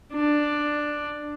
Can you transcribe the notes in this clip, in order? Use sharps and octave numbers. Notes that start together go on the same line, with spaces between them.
D4